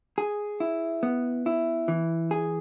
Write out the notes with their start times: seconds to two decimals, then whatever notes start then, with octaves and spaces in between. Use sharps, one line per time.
0.18 G#4
0.60 E4
1.03 B3
1.46 E4
1.88 E3
2.31 G#4